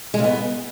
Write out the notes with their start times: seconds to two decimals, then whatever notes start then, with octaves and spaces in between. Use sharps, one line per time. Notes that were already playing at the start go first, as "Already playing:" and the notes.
0.14 G#3
0.19 C#3
0.24 B3